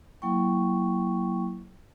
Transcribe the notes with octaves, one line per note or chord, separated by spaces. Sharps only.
F#3 A#3 E4 G5 C#6